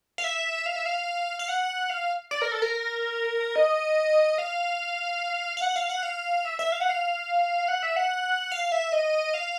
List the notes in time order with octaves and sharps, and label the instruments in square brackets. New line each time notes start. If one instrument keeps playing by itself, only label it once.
[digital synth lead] F5
E5
F5
E5
F5
F5
F#5
F5
D5
A#4
A4
A#4
D#5
F5
F5
F#5
F5
F#5
F5
E5
E5
F5
F#5
F5
F#5
E5
F#5
F5
E5
D#5
F5